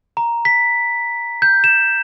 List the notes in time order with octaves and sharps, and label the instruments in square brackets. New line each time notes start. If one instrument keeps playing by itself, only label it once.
[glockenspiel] A#5
B6
G6
E7